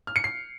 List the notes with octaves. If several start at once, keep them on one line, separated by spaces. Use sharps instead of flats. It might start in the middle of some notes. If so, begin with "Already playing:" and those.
F6
C#7
C7